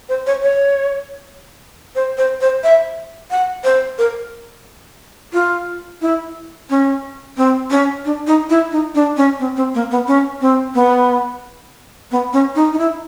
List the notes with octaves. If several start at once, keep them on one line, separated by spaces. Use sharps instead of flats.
C5
C#5
C#5
C5
C5
C5
E5
F#5
C5
A#4
F4
E4
C#4
C4
C#4
D4
D#4
E4
D#4
D4
C#4
C4
C4
A#3
B3
C#4
C4
B3
B3
C#4
D#4
D#4
E4